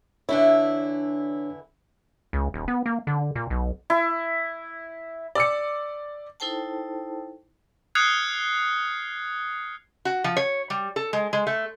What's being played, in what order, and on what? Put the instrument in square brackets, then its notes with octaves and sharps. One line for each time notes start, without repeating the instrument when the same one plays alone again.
[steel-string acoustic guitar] D3 E3 E4 [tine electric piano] D4 C#5
[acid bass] C#2
D#1
B3
A#3
D3
A#2
B1
[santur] E4
[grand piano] D5 E6 C#7
[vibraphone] D#4 E4 A4 C5 G5 A5
[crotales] D#6 F6 F#6 G#6 C7 C#7
[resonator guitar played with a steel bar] F#4
F3
C#5
G3
A4
G#3
G#3
A3